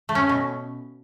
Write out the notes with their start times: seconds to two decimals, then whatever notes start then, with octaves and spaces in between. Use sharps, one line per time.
0.09 A3
0.15 C#4
0.29 B2